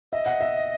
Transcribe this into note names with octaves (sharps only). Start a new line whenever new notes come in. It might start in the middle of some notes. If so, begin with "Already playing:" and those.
D#5 E5
F#5
E5